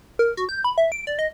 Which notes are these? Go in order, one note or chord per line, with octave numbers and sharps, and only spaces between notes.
A#4
F#4
G6
B5
E5
D7
D5
D#5